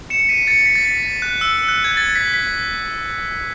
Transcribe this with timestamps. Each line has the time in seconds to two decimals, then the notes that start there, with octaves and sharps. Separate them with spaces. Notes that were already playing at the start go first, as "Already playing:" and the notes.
0.10 C#7 E7
0.29 B6 D#7
0.47 A6 C#7
0.66 B6
0.75 A6
0.85 B6
1.03 A6
1.22 F#6
1.41 E6
1.69 F#6
1.84 G#6
1.97 A6
2.15 B6
2.34 B6